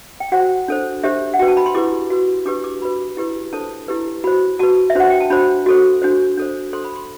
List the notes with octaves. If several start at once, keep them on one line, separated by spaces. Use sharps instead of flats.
G5
F#4 C5 F#5
D4 A4 C5
D4 G4 C5 E5
F#5
F#4 B4 G5
A5
B5
C6
E4 G4 B4 D6
F#4 B4
D4 G4 B4 D6
D6
F#4 B4 B5
E4 G4 B4
D4 A4 C5 A5
E4 G4 B4
F#4 C5 B5
F#4 B4 A5
E5
D4 F#4 C5 F#5
G5
A5
D4 F#4 C5 B5
F#4 A4 C5
D4 F#4 C5
D4 A4 C5
D4 A4 C5 C6
B5
C6